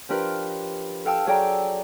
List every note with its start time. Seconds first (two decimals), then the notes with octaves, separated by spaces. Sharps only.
0.09 F3 D4 G4 A#4 B4 F6
1.05 A4 F5 G5 A5 E6
1.27 F#3 G#4 A4 D5 G5 A#5